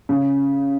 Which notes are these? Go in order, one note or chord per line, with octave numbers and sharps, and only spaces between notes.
C#3